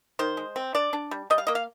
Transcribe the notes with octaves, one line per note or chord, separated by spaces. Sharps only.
D#3 C5
G#3
C4
D4 D5
D4
G3
G3 D#5
F5
A#3 D#5
F5